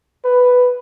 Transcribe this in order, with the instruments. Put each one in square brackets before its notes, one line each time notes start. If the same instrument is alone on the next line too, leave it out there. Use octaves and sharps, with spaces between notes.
[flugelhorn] B4